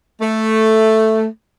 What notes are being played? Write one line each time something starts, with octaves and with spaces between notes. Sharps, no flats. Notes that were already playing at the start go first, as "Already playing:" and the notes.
A3